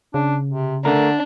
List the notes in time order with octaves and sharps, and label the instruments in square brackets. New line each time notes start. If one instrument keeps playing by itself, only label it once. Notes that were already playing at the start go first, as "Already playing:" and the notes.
[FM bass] C#3 [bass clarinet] D4
[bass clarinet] C3
[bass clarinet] D3 [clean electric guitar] A3 A#4 [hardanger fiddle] D4